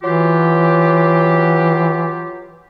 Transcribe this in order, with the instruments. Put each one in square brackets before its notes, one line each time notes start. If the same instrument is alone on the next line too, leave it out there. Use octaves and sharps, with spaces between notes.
[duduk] E3 [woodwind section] F#3 F4 G4